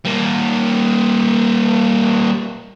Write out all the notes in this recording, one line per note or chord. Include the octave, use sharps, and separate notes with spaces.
G3 A#3